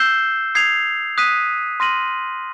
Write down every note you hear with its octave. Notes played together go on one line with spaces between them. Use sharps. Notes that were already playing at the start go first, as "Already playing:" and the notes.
Already playing: E6 G6 C7 E7 G7
D#6 G#6 C7 F7
D#6 F#6 B6 D#7
C6 F6 A#6 D#7 F#7